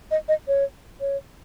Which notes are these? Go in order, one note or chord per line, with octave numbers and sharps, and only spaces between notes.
D#5
D#5
C#5
C#5